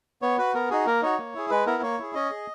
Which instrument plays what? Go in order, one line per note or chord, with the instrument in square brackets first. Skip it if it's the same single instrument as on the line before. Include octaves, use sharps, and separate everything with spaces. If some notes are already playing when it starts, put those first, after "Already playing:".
[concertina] B3 C#5
F#4 B4
B3 A#4
D#4 F#4 G#4
A#3 A#4
D#4 F#4 C#5
A#3
E4 G#4
G#3 B4
B3 E4 A#4
A#3 C#5
E4 G#4
C#4 D#5
G#4